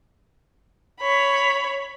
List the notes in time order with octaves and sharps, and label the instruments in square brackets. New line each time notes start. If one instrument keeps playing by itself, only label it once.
[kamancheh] C#5 B5